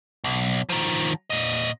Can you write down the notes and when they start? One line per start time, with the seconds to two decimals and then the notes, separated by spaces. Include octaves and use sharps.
0.24 B1
0.69 D#3 F3
1.30 A#2 D#5